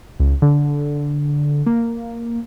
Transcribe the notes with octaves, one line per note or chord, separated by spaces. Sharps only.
C#2
D3
A#3